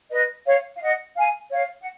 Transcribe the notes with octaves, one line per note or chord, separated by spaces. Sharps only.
B4 D#5
C#5 F5
F5
D#5 F#5
F5 G#5
C#5 F5
F#5